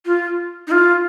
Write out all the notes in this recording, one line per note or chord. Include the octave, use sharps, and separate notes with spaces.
F4
D#4
F4